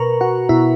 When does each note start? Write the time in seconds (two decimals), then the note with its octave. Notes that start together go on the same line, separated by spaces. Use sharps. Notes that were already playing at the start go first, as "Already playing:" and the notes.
Already playing: B2 A#4 B4 A#5 C#6
0.21 F#4 F#5
0.49 B2 E4 E5